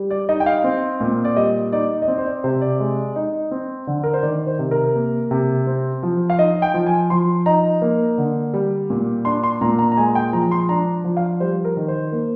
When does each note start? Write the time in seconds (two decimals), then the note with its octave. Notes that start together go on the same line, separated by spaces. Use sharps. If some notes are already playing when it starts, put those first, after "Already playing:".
Already playing: G3
0.10 D5
0.29 D#4 D#5
0.40 G5
0.46 F5
0.64 C4
1.01 A#2
1.25 D5
1.36 G3 D#5
1.72 D#4 D5
2.02 D#5
2.08 C4 D5
2.18 C5
2.26 D5
2.44 C3 C5
2.61 D5
2.80 G#3
3.16 D#4
3.51 C4
3.87 D3
4.04 A#4
4.14 C5
4.23 D#3 D5
4.47 C5
4.59 C3
4.71 A#4
4.95 A#3
5.31 C3
5.67 C4
6.03 F3
6.30 F5
6.38 D#4 D#5
6.62 G5
6.74 F3
6.86 G#5
7.10 F3 C6
7.46 D#4 A#5
7.82 A#3
8.18 D3
8.54 G3
8.90 A#2
9.25 D4 C6
9.43 C6
9.61 A#2 A#5
9.79 A#5
9.92 A#5
9.97 G#3 G#5
10.15 G5
10.33 F3 A#5
10.51 C6
10.69 D4 A#5
11.04 F3
11.17 F5
11.40 G3 C5
11.65 A#4
11.77 D#3
11.88 C5
12.12 A#3